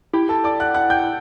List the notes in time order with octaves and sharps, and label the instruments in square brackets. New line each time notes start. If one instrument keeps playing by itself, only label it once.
[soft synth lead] E4 [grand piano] G4 G5
[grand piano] A4 A5
D5 D6
F#5 F#6
F#5 F#6
G5 G6